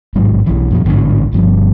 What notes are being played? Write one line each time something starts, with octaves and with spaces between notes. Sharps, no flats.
A1 G#2 F#3 G#3
B1 E3
F#2 A#2 F3
A1 G#2 D3
G1 G2 F3